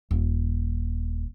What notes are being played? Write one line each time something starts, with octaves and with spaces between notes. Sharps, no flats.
D#1